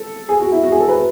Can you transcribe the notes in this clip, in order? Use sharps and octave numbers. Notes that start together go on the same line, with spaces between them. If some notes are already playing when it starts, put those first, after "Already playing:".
Already playing: A4
G#4
F#4
E4
F#4
G#4
A4
B4